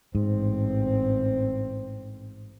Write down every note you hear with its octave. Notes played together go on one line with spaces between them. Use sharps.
A1 G#2 C4